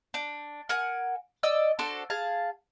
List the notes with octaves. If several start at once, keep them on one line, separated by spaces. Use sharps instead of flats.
D4 G6
A#4 F#5 G#5
D5 D#5 E6
D4 F#4 A4 C5
G#4 F5 A5